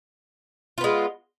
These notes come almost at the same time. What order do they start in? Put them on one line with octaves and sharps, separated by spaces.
F4 B3 G#3